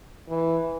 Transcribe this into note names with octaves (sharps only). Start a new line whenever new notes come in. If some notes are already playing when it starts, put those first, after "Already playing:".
E3